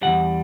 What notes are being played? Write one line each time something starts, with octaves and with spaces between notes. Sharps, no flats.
E2 D#3 G3 F#5